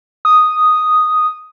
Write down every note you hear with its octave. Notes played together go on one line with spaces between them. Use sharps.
D#6